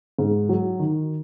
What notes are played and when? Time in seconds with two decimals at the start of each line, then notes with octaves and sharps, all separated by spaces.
0.18 G#2
0.49 F#3
0.79 D#3